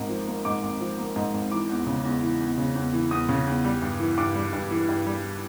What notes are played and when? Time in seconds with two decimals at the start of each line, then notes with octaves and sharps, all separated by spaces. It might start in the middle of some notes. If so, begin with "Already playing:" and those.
Already playing: G#1 G#2 A#3
0.10 F3
0.27 A#3
0.45 G#2 D6
0.63 G#1
0.81 F3
0.98 A#3
1.16 G#2
1.34 G#1
1.51 E3 D6
1.69 E2
1.87 C#3
2.05 E2
2.23 E3
2.40 E2
2.57 C#3
2.75 E2
2.94 E3
3.11 E2 D#6
3.29 C#3
3.46 E2
3.64 G3
3.82 G2
4.00 E3
4.18 G2 D6
4.35 G3
4.53 G2
4.71 E3
4.89 G2
5.06 G3